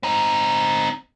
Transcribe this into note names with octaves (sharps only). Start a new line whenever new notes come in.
C4 D#4